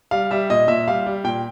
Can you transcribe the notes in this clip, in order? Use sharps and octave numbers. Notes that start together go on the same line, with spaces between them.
G3 F5
G3 E5
A#2 D#5
A#2 E5
G3 F5
G3
A#2 G5